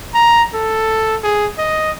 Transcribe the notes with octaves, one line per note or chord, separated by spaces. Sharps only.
A#5
A4
G#4
D#5